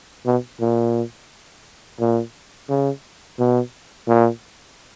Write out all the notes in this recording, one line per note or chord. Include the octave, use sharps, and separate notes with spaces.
B2
A#2
A#2
C#3
B2
A#2